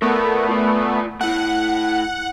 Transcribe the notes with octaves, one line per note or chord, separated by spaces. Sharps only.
A3 B3 A#4 D5
F4 D5
A3 E4 F#5